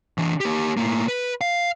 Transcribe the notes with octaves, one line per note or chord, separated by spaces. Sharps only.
E3 D4
A#3 G4
A2 A#3
B4
F5